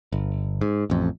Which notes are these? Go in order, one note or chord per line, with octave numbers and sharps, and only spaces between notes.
G1
G#2
A1 F2